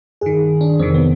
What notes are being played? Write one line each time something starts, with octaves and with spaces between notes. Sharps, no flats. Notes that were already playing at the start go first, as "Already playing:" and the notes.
G2 D#3 G#4
D4
F2 C3 D#3 C4
B3